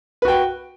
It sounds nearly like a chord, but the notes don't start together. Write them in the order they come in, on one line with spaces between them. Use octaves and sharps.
B4 F#4 G5